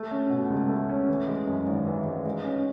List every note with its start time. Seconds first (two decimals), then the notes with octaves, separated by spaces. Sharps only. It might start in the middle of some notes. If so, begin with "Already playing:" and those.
Already playing: A3
0.11 C#4
0.30 B2
0.50 C#2
0.69 A3
0.89 C#4
1.08 E3
1.27 G#3
1.47 F#2
1.67 G#1
1.87 E3
2.05 G#3
2.26 G#3
2.44 C#4